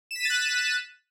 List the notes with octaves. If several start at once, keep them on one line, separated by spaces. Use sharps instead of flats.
F#6 A6 B6 D#7 E7